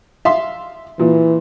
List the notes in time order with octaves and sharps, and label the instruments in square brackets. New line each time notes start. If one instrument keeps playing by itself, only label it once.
[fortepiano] E5 F5 C6
[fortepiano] A#2 [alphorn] E3